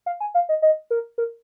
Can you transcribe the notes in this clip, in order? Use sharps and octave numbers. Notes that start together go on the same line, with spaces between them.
F5
G#5
F5
D#5
D#5
A#4
A#4